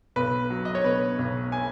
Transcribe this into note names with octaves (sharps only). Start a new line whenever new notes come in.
B1 B4
F#3
D#5
C#5
B2 B4
B1
G#5